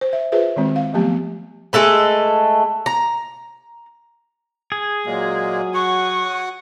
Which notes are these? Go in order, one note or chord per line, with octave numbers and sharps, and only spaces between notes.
C5
E5
F4 G#4 B4 C5 E5
D#3 G#3 C4
F5
F3 F#3 A3 B3 G4
G#3 A3 A4 B4
A#5
G#4
A#2 F#3 G#3 A#3
F#4 F#5 C#6